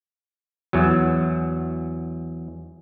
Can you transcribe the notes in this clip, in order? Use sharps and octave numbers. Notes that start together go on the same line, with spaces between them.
E2 F#3